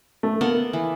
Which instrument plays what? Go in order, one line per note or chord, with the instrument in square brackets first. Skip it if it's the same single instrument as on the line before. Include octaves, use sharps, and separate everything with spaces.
[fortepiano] A3
[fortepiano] A#3 [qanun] B3 A4 F#5
[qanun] E3